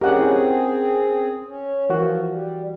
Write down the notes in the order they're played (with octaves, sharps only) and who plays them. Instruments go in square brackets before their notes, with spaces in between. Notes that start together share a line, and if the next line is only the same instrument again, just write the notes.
[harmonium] C4 G#4 [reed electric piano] C#4 A#4 [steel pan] G4 D#5 F#5
[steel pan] E4 C#5 F#5
[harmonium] C#4
[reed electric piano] E3 F#4 [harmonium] F3 [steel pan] A#4
[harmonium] G3